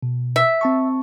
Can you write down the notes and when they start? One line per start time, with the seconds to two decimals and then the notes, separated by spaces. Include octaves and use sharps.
0.03 B2
0.36 E5
0.61 C4 A5 C#6